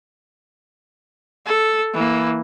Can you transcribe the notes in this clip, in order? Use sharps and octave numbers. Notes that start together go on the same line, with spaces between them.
A4
E3 A#3